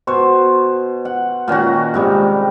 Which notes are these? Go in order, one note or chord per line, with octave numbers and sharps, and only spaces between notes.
B2 C5 C#6
F#5
A#2 D#3 C#4 F#4
G#2 C3 G3